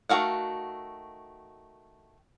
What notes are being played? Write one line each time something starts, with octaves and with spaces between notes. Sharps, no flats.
D#3 A3 F#4 F5 F#5